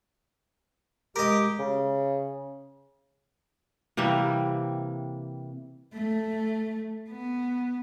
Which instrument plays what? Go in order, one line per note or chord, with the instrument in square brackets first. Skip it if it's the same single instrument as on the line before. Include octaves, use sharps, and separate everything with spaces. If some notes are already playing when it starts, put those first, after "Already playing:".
[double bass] G#3 [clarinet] G4 [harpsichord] A#4 D#5
[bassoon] C#3
[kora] C3 E3 G3 A#3
[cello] A3
B3